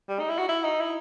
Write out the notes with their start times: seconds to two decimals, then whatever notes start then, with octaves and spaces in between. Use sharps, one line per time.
0.08 G3
0.19 D#4
0.29 E4
0.38 F#4
0.49 E4
0.64 D#4
0.80 E4